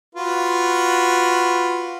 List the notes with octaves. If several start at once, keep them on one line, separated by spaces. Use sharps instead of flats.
F4 F#4 B4